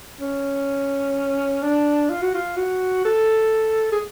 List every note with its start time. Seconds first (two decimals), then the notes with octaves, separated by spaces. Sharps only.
0.19 C#4
1.62 D4
2.09 F4
2.22 F#4
2.34 F4
2.57 F#4
3.05 A4
3.92 G#4